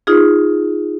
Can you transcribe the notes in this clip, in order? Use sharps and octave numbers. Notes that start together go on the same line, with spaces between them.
D#4 F4 G#4